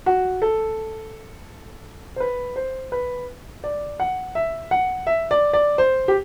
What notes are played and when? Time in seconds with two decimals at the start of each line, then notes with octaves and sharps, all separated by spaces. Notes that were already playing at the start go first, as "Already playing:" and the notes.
0.06 F#4
0.42 A4
2.16 C5
2.20 B4
2.56 C5
2.92 B4
3.64 D5
4.00 F#5
4.35 E5
4.71 F#5
5.07 E5
5.31 D5
5.53 D5
5.78 C5
6.08 G4